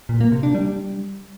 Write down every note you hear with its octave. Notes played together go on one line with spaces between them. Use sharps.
A#2
A#3
C3
D4
G3